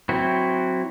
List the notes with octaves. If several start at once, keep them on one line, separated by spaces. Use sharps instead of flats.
F#3 C4 E4 F#4